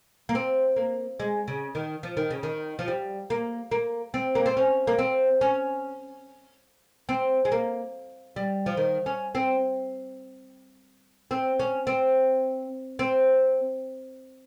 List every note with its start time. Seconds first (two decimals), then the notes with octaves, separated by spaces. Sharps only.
0.29 A#3
0.35 C4
0.76 A#3
1.20 G#3
1.48 C#3
1.75 D#3
2.03 F3
2.17 D#3
2.30 C#3
2.43 D#3
2.79 F3
2.88 G3
3.30 A#3
3.71 A#3
4.14 C4
4.35 A#3
4.46 C4
4.57 C#4
4.87 A#3
4.98 C4
5.41 C#4
7.09 C4
7.45 G#3
7.52 A#3
8.36 G3
8.66 F3
8.77 D#3
9.06 C#4
9.35 C4
11.31 C4
11.59 C#4
11.87 C4
12.99 C4